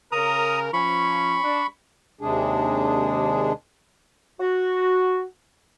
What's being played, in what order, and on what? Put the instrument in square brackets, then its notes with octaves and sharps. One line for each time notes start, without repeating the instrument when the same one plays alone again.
[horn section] C#3 A#4 [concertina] A#5 D#6
[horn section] F3 C#4 [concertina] B5 C#6
[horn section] D4
[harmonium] D#2 C3 G#3 D4 G#4
[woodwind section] F#4